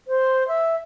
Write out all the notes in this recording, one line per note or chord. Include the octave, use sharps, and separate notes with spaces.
C5
E5